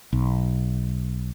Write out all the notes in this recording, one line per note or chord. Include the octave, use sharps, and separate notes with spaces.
B1